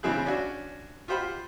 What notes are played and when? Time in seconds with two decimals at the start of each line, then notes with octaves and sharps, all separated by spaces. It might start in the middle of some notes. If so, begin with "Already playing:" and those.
0.03 G2 C#3 E3 C4 G#4 F#6
0.25 C#4 D4 F#4
1.08 F4 G4 C5 F#5 B5